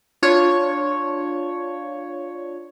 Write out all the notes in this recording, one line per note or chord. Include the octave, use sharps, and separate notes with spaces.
D4 F4 C#5